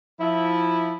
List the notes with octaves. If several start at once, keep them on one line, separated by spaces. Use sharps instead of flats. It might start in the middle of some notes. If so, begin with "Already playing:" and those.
F3 E4